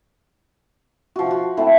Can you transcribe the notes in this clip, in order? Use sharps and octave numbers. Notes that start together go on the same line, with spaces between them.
F3 F#4
F#4
A3 C4 E4